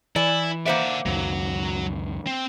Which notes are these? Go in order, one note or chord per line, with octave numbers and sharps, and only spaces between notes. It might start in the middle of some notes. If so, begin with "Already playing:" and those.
E3 E4 D5 G#5
A#3 C5 D5 E5 F#5
C#2 F#2 D#3 F#3
C4